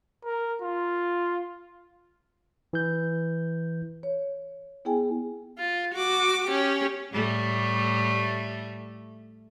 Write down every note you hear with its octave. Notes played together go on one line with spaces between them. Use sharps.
A#4
F4
E3 G6
C#5
B3 E4 G#4 G5 G#5
F4
F#4 D6
C#4 G4
A2 G3 A3